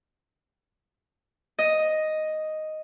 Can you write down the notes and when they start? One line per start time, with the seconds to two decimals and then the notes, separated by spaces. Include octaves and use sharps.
1.59 D#5